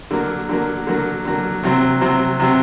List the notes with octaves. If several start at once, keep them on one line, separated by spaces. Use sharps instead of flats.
D3 F#3 A#3
D3 F#3 A#3
D3 F#3 A#3
D3 F#3 A#3
C3 F#3 C4
C3 F#3 C4
C3 F#3 C4